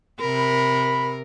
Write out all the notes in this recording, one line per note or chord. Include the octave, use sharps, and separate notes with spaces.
C3 A#4 B5